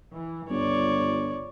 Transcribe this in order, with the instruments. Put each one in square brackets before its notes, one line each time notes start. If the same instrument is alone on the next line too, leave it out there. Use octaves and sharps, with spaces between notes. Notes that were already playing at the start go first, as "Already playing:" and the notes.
[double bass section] E3
[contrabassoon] G1 [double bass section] C#2 G2 [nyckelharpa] C#5 D5